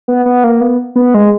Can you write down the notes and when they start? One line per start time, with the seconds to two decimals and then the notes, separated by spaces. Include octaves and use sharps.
0.08 B3
0.26 B3
0.44 A#3
0.61 B3
0.96 B3
1.14 G#3